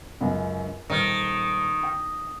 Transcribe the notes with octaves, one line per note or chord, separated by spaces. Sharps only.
C#2 F#2
D#1 D#3 F6
G5